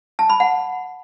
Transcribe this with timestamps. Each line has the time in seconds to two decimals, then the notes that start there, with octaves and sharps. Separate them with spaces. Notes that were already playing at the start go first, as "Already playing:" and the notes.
0.19 A5
0.29 B5
0.40 F#5